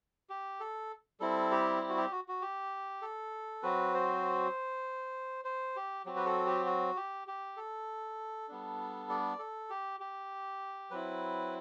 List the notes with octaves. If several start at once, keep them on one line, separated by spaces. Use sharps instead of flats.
G4
A4
G3 C4 E4 A4
G4
G4
F#4
G4
F#4
F#4
G4
A4
F#3 C4 F#4 B4
C5
C5
G4
F#3 C4 F#4 G4
B4
A4
G4
F#4
G4
G4
A4
G3 B3 D4
D5
A4
G4
G4
F#3 C4 E4 B4